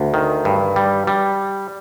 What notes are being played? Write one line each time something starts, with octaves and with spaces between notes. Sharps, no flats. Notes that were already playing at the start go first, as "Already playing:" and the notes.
Already playing: D2
D#3
G2
G3
G3